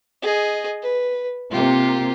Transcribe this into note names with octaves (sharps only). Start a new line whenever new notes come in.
G#4 D#5
B4
C3 A#3 F4 G4